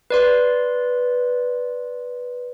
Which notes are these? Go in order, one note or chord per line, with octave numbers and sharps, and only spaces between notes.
B4 D5 C6